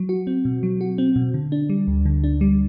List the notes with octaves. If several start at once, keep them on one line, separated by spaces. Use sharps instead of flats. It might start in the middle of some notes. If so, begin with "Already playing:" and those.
Already playing: F#3
F#4
C4
B2
F#3
F#4
C4
B2
D3
D4
G3
D2
D3
D4
G3